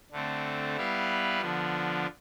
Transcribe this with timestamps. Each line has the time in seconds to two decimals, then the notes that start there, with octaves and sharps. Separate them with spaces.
0.11 D3 A3 C4
0.77 G3 B3 E4 B4 F5
1.41 D3 F3 B3 D4